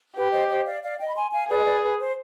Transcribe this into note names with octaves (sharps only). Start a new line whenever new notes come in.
G4 B4
C5 D#5
C5 D#5
D5 F5
D5 F5
D#5 G5
B5
G#5 C6
F5 G#5
G#4 B4 D5
D#5
B4 D5
B4
C5